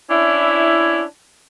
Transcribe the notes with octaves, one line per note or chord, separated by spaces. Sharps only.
C#4 D4 E4